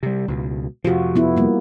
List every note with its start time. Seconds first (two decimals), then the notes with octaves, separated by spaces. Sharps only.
0.03 C3 G3
0.28 C#2 B2
0.85 F2 C3 F3 F4 F#4
1.16 B3 E4
1.37 G3 A#3